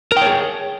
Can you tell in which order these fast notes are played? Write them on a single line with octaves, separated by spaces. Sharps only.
A#4 G5 C#5 G#4